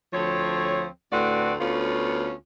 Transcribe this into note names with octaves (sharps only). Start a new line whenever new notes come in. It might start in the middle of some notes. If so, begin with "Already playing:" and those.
D2 F3 C4 C#5
D2 A2 C4 F#4 B4 D5
D2 B3 C#4 F4